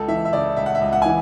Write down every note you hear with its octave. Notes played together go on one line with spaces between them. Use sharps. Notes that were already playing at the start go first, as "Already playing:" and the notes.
Already playing: C#2 A4
E3 E5
E5
C#3 D5
C#2 E5
F#5
E5
C#2
F#5
E3 G#5